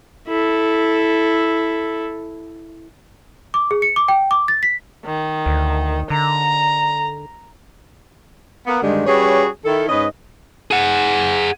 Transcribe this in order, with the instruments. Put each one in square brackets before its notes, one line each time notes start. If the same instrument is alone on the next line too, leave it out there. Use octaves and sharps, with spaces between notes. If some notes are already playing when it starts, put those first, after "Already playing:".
[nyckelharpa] E4 A4
[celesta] D6
G#4
C#7
D6
G5
D6
A6
B6
[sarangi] D#3
[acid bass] D2
[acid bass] D3 [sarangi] A#5
[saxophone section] A#3 B3
G2 D3 D#3 G3 G#3
G3 C#4 F#4 G#4 B4 C#5
D#3 E4 A4
G#2 C#4 B4 D#5
[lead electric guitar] G#4 F#5